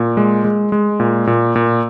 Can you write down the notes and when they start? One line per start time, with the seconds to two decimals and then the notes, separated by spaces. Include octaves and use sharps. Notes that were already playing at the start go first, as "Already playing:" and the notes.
Already playing: A#2
0.17 G#3
0.44 G#3
0.72 G#3
1.00 A#2
1.27 A#2
1.56 A#2